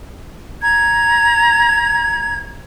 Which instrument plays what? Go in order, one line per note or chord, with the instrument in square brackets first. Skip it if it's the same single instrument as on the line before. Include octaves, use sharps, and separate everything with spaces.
[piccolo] A#5 [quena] G#6